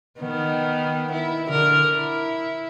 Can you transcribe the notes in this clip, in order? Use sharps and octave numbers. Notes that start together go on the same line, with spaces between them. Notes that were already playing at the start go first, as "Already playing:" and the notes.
D#3 B3
E4
D3 A#4
E4